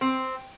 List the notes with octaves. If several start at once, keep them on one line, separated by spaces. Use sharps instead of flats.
C4